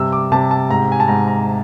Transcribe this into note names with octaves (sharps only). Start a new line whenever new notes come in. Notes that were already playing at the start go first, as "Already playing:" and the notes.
Already playing: G2 C3 E6
D6
C3 A5
A5
G#2 A#5
G#5
A5
G#2 A#5
A#5